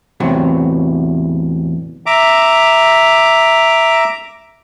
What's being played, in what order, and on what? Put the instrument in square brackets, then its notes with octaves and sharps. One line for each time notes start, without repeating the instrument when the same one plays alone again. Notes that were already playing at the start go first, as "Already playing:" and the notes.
[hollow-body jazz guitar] E2 A2 C3 F#3
[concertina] E5 A#5 D6